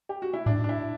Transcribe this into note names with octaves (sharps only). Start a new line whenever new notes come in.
G4
F#4
E4
A2 D4
D4
E4